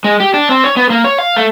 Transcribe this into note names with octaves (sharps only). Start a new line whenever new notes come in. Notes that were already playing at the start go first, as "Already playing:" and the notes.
G#3
G4
D4
C4
C#5
B3
A#3
C#5
F5
A3